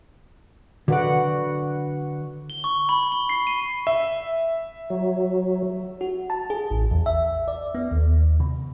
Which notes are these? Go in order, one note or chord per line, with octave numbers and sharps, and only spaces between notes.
D3 F#4 B4 D5 F#5
G7
C#6
B5
G7
C7
D#7
E5
F#3
F#4
A5
G#4
A1
E2
E5
D5
B3
D#2
C3